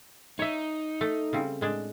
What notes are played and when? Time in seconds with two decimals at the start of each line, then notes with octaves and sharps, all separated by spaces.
0.39 D#4 C#5 E5
1.01 A3
1.33 C#3 G3 C4
1.61 A2 G#3 D4